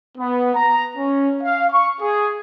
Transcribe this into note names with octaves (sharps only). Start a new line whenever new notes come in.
B3
A#5
C#4
F5
C#6
G#4